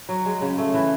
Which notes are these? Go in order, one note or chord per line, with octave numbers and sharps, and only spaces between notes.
F#3
G#3
C#3
A3
E3